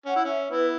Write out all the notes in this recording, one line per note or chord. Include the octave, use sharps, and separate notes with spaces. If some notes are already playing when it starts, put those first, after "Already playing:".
C#4 F#5
E4
C#4 E5
B3 E4 B4